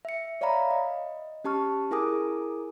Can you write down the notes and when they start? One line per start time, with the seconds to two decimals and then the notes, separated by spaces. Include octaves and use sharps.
0.05 E5 C#7
0.41 C#5 D5 E5 F5 A#5 B5
0.71 D#5
1.44 C#4 G4 A5 C#6 F6
1.91 E4 G#4 A#4 G#5 D6 D#6